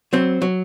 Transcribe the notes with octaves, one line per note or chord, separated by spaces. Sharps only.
F#3 C4
F#3